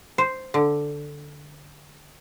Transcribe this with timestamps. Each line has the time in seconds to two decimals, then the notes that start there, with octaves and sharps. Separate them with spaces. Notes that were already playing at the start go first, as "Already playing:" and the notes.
0.18 C5
0.54 D3